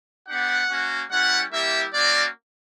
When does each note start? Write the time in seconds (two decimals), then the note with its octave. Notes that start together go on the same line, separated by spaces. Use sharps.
0.28 B3 D4 G4 F#5
0.70 A#3 C#4 F#4
1.11 G3 C#4 E4 F#5
1.53 G3 A#3 E4 G4 E5
1.94 A#3 C#4 F#4 D5